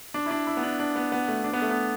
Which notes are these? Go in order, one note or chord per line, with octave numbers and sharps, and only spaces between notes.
D4
E4
D4
E4
B3
D4
D4
B3
B3
A3
D4
B3
A3
B3